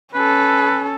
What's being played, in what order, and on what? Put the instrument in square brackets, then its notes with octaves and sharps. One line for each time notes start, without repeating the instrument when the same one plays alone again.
[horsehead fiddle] C#4 A4 [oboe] B4